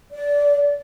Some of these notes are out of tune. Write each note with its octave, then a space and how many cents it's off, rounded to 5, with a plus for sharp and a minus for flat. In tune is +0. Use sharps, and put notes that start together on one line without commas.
D5 -20